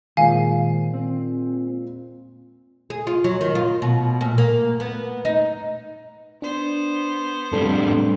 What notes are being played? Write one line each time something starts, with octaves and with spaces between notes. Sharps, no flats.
A#2 D#3 G#3 C5 F5 G#5
C4
G#4
F4
F#3
D#3
F4
B2
A#2
A#3
B3
D#4
B3 D4 C5
A2 G3 C4 D4 A4